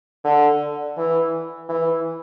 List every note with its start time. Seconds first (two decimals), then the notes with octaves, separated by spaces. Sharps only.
0.25 D3
0.97 E3
1.69 E3